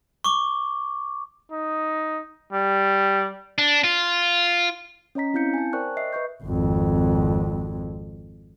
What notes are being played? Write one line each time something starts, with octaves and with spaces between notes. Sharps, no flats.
C#6 D6
D#4
G3
D4
F4
C#4 C#5 D#5 A#5 B6
C4 E4 F5 G6 C#7
G#5 A5
A#4 C5 D5 G5 C#6 F#6
D#5 E5 C7
B4 D#5 C#6 G6
G#1 F2